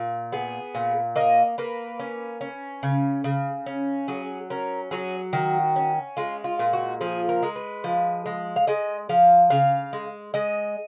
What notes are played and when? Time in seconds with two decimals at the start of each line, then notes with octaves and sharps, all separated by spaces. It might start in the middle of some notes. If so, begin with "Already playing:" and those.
Already playing: A#2
0.32 B3 G#4
0.75 A#2
1.16 A#3 D#5
1.58 A#3 B4
1.99 C#4
2.41 C#4
2.83 C#3
3.24 C#3
3.66 C#4
4.08 F#3 G#4
4.50 C#4 A#4
4.91 F#3 G#4
5.33 D#3 F#4
5.76 C#4
6.17 G#3 F4
6.44 F4
6.59 A#2
6.73 F#4
7.01 F3 G#4
7.29 A#4
7.43 G#3
7.56 B4
7.84 F3
8.26 G#3
8.56 F5
8.67 G#3 D#5
9.09 F3 F5
9.50 C#3 F5
9.93 G#3
10.34 G#3 D#5